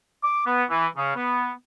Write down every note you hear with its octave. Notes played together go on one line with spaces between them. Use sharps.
D6
B3
E3
C#3
B3